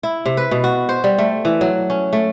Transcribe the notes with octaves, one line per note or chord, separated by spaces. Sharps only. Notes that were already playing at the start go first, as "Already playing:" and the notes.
E4
C3
B4
B2
F#4
C5
G3
A3
E3
F#3
C#4
A3